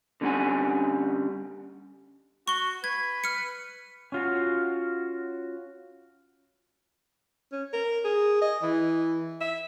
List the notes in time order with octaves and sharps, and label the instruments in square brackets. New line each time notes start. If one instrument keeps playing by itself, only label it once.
[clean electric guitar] D3 G3 C4 C#4 F#5 G#5
[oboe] F#4 [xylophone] C#6 G7
[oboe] B4 [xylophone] G#6
[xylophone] F6 C#7
[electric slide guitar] C#4 F4 F#4
[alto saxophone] C#4
A#4
G#4
D#5
E3
E5